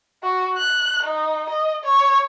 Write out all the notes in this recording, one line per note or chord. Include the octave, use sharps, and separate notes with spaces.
F#4
F#6
D#4
D#5
C#5